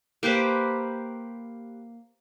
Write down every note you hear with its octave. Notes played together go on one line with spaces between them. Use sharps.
A#3 G4 B4 C5